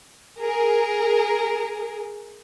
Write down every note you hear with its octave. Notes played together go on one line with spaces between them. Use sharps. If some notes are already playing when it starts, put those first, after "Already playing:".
G#4 A#4